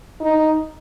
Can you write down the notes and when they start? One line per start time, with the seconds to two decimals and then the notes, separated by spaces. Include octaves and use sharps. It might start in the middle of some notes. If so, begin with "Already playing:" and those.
0.21 D#4